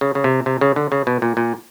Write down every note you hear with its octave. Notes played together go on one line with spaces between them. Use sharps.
C#3
C#3
C3
C3
C#3
D3
C#3
B2
A#2
A#2